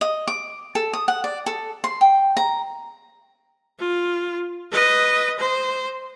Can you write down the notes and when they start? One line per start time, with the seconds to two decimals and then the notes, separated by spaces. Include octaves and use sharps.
0.01 D#5
0.28 D6
0.75 A4
0.94 D#6
1.08 F#5
1.24 D5
1.46 A4
1.84 C6
2.01 G5
2.37 A#5
3.79 F4
4.72 B4 D#5
5.39 C5